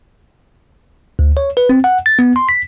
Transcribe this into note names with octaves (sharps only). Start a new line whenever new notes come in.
D2
C#5
B4
C4
F#5
A6
B3
C6
B6